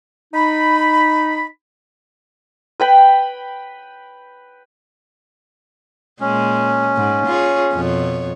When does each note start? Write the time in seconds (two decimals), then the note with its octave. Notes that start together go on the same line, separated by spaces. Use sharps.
0.34 D#4 B5
2.80 B4 G5 B5
6.21 A#2 G#3 C#4
6.96 G#2
7.26 F4 G#4 C#5
7.73 F2 B2 C#5